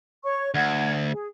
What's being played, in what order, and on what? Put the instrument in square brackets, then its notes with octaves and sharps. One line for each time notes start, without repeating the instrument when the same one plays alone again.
[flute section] C#5 C#6
[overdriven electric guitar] D2 [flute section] F#5 G#6
[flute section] G#4